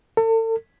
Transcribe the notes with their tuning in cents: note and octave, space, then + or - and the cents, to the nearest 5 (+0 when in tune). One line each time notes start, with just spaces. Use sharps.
A4 +40